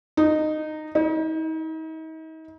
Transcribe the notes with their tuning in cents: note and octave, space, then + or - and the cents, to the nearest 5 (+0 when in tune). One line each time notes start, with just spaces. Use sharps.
D#4 -15
D#4 +40